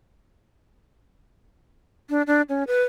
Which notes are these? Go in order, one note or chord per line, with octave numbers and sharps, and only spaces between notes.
D4
D4
C#4
B4